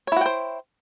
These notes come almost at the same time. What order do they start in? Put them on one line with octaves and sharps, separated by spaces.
C#5 E4 F#4 G5 C5